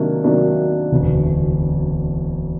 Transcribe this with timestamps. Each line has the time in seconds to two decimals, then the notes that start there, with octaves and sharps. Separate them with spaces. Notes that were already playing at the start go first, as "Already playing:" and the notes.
Already playing: C3 D#3 F#3 A#3 D4
0.24 C3 D#3 F#3 A#3 D4
0.92 E1 D2 C3